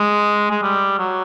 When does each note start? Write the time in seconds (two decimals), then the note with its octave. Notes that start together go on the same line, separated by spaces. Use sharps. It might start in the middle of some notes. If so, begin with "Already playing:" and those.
Already playing: G#3
0.51 G#3
0.62 G3
0.99 F#3